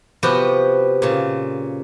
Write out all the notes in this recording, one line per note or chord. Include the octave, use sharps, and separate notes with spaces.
C3 F3 B3 F#4 G4
A#2 C#3